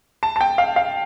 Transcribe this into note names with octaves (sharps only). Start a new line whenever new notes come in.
A5
A5
G5
F5
F5